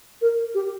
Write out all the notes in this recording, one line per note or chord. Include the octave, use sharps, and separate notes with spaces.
A#4
G4